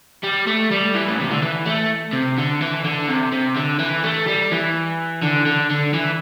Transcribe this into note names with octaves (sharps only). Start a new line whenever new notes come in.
G3
A3
G3
E3
A2
C3
D3
E3
A3
C3
D3
E3
D3
C3
C3
D3
E3
A3
G3
E3
D3
D3
D3
E3